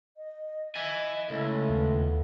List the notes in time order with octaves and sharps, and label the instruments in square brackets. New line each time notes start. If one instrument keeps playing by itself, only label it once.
[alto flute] D#5
[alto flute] D#5 [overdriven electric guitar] E5 G#5
[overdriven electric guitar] C#2 [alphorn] A3 [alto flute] E4
[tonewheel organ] D#2 [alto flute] B3